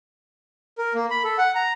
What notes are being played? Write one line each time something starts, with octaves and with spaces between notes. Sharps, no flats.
A#4
A#3
B5
A4
F#5
A#5